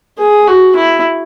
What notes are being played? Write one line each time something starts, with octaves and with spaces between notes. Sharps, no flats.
G#4
F#4
E4